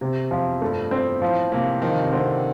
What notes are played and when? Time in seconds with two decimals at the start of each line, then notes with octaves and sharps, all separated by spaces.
0.01 C3
0.31 F2 F3
0.62 G2 A3
0.91 C4
1.21 A2 F3
1.52 C3 A#3
1.82 D#3 F3
2.02 C3
2.13 D3 C4